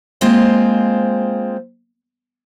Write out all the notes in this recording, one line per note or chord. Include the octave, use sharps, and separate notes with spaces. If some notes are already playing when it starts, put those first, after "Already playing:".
G#3 A#3 C4 F4 C5 D#5